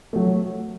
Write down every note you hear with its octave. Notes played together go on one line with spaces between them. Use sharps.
F#3 A3